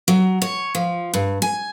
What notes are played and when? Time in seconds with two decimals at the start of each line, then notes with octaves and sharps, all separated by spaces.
0.08 F#3
0.42 C#5
0.75 F3
1.14 G2
1.42 G#5